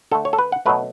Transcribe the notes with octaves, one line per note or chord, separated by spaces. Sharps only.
D3 A3 A4
C#5
A4
B4
F#5
B2 F#3 A3 B4